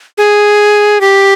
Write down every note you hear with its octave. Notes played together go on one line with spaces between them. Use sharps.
G#4
G4